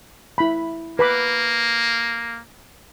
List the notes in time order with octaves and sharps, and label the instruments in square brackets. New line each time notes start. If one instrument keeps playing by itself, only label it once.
[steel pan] E4 B5
[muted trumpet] A#3 [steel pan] B4 B5 D6